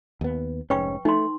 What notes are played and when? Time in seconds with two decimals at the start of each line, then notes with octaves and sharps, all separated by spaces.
0.21 D#2 B3
0.70 F1 G#2 C#4 B4 G5 C#6
1.05 A3 D#4 C6